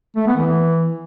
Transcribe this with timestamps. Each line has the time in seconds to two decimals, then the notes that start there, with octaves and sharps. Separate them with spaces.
0.16 A3
0.27 B3
0.37 E3